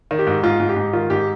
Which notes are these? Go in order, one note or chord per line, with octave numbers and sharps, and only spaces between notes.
D#3
G4
G#2
G#2 F4
G#2
G4
G#2
D#3 F4
G#2 G4